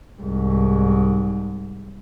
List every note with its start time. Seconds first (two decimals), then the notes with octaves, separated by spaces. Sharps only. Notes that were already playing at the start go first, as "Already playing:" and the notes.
0.22 C2 G#2